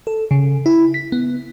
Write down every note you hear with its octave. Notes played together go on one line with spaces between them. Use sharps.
A4
C#3
E4
B6
B3